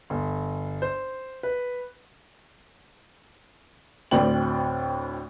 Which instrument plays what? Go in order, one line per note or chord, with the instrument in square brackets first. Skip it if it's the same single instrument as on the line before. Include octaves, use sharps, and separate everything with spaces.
[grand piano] G1
C5
B4
[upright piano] D2 A2 C4 D5 G5 F#7